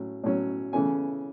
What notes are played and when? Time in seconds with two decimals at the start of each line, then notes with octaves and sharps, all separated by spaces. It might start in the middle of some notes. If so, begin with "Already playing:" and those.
Already playing: A2 F#3 C#4
0.24 A2 F#3 C#4
0.73 C#3 E3 A3 C#4 G#5